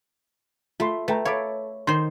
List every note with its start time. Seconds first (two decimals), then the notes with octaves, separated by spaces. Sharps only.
0.80 A3 F4 B5 C6
1.08 A3 B4 G5 A#5
1.25 A4 C#5 F5 B5 D6
1.87 D#3 C5 D5 C6